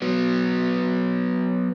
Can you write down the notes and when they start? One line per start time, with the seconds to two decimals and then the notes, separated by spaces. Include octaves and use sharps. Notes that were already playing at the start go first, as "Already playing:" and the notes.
0.02 F#3 B3